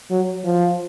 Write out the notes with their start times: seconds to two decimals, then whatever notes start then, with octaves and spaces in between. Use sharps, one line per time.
0.11 F#3
0.45 F3